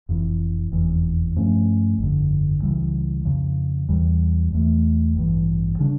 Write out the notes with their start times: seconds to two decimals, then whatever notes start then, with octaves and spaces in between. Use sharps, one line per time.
0.09 F1 F2 E3
0.72 F1 E2 E3
1.36 G2 F3 A3 C#4
1.98 G1 F2 D3
2.62 C#2 C#3 E3 G3
3.25 F2 C#3 F3
3.89 E2 E3 G3
4.52 E2 E3 A3
5.15 A1 G2 E3
5.79 C#3 G3 D4